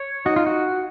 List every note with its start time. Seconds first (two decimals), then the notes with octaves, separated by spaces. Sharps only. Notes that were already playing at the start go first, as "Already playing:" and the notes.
Already playing: C#5
0.26 D#4 F#4
0.36 F4
0.46 F#4